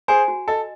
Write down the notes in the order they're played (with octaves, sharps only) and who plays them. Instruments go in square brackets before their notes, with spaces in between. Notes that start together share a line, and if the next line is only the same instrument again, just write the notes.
[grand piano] G#4 C5 [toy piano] G#5
[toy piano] F#4
[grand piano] A4 [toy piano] D#5